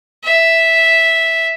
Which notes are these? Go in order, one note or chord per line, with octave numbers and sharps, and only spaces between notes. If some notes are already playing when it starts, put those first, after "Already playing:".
E5